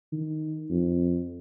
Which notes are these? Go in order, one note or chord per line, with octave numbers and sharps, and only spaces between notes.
D#3
F2